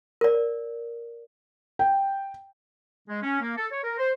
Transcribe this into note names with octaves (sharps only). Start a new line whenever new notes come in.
A#4 D5
G5
G#3
C#4
A#3
A4
C#5
A#4
C5